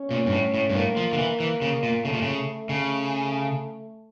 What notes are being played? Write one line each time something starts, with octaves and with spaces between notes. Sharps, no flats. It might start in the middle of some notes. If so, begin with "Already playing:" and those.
Already playing: C#4
A#2
G2
A2
A2
G2
A2 A#3
F3
D3
E3
E3
C#3
A#2
C#3 A3
A#2
C#3
C#3 A3